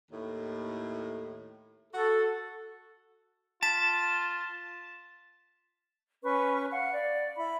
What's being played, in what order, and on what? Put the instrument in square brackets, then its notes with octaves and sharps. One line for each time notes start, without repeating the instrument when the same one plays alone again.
[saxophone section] D#2 A2
[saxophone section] F#4 [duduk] A4
[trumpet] F4 [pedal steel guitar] A5 [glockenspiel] A6 B6 E7
[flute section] C#4 B4 C#6
F5 F#5
D5
E4 B5